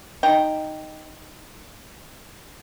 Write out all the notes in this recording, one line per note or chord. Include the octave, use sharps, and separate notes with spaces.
D#4 G5 A#5